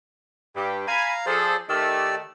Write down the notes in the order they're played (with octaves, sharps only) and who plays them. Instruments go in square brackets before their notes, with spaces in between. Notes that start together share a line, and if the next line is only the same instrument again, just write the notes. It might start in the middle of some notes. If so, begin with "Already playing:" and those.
[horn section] G2 G4
[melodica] F5 A#5 [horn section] G#5 B5
[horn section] F3 A4 [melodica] G#4 C5 D5
[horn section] D#3 A3 [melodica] G4 D5 E6